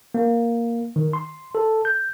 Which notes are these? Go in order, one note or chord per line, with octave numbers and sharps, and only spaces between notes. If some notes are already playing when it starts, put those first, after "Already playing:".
A#3
D#3
C6
A4
G6